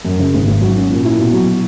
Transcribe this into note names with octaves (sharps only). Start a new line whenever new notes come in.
F#2
C#3
G#1
G#1
F#3
C#4
A#2
E4
B2
F#3